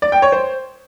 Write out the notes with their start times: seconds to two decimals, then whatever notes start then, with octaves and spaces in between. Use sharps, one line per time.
0.02 D5
0.12 G5
0.22 C#5
0.32 C5